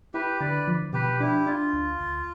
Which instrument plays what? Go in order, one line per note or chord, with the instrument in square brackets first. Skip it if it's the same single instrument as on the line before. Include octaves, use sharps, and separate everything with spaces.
[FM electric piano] E4 [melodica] G4 B4
[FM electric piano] D3 [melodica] B4 D5
[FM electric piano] F3
[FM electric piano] B2 [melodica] G4 B4
[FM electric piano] D4 [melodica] E4 G4
[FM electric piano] D4 [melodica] F4
[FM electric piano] D2
D2